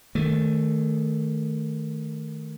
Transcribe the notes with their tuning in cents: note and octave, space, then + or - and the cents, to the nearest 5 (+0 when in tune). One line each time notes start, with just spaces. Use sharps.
D#3 +0 A3 +0